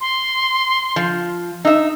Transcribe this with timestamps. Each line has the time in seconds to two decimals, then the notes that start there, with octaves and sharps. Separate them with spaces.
0.01 C6
0.96 F3
1.65 D#4 E5 E6